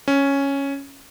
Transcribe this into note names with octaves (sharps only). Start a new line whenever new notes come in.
C#4